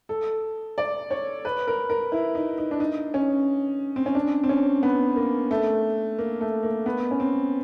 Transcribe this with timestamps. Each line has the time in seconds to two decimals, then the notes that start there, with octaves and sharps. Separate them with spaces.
0.09 A4
0.78 D5
1.11 C#5
1.45 B4
1.67 A#4
1.90 A#4
2.12 E4
2.35 D#4
2.58 D#4
2.71 D4
2.80 D#4
3.14 C#4
3.96 C4
4.06 C#4
4.15 D4
4.44 C4
4.49 C#4
4.83 B3
5.16 A#3
5.51 A3
6.18 A#3
6.41 A3
6.63 A#3
6.86 B3
7.11 C#4
7.20 C4